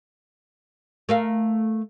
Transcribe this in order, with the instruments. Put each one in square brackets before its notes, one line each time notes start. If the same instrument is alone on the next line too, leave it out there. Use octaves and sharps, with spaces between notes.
[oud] A3 A#4 F5